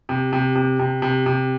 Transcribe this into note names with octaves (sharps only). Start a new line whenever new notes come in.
C3
C3
C3
C3
C3
C3